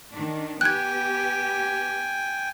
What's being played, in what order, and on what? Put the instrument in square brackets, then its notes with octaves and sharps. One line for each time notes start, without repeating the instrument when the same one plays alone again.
[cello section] D#3 D4
[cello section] B3 G4 [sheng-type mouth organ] G5 G#5 [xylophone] F#6 G#6